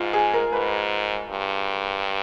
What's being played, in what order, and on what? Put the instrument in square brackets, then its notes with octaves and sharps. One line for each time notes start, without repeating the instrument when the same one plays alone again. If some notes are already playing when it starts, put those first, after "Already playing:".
Already playing: [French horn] G#2 [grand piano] F4
[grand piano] G#4
A#4
[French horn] G#2 [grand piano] B4
[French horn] G2